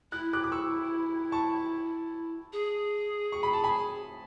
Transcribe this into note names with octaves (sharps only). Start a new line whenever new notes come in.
E4 F#6
D6 F#6
D6
C#6 E6
A5 C#6
G#4
C#6
B5
A5
G#5 B5